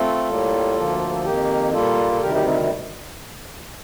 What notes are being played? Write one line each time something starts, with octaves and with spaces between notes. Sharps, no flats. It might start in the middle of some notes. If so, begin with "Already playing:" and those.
Already playing: A3 C4 F4 A4
A2 G3 A#3
D2 D3 F3 A#3
A4
F2 D#3 A#3 D#4 G4
A#2 G3 A#3 F4 A4
A4
D2 C3 D#3 G3 G4 A#4
D#4 G4
C4 D#4